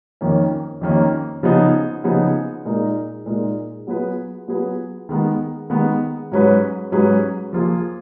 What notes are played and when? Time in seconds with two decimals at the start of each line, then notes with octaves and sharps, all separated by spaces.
0.21 F2 D#3 A#3 C#4
0.81 F2 D#3 A#3 C#4
1.43 C#3 F3 B3 D#4 G#4
2.04 C#3 F3 B3 D#4 G#4
2.65 A#2 G#3 D#4 A#4
3.26 A#2 G#3 D#4 A#4
3.87 F#3 B3 F4 G#4 B4
4.48 F#3 B3 F4 G#4 B4
5.09 D#3 G#3 B3
5.70 D#3 G#3 B3
6.32 G#2 F#3 C#4 G#4 B4
6.92 G#2 F#3 C#4 G#4 B4
7.53 F3 A#3 F4 G#4